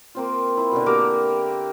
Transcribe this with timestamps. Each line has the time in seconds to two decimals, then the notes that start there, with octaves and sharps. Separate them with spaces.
0.15 A#3 C4 F4
0.57 E4
0.72 B2 D3
0.86 A#3 G4 A#4 D6